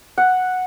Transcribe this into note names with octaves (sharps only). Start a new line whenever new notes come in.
F#5